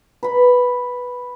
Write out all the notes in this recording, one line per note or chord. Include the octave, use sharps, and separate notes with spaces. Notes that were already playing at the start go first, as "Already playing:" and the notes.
B4 B5